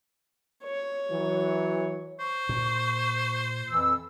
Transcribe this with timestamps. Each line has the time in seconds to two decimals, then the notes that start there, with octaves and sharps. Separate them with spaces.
0.64 C#5
1.10 E3 F#3
2.19 C5 C#6
2.49 A#2
3.70 F2 E3 E6